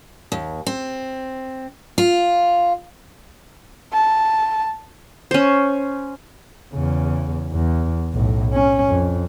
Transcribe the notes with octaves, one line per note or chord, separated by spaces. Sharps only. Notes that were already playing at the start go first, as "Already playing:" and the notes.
D#2
C4
F4
A5
C#4 C5
E2 C#3
E2
B1 A2
C#4
F2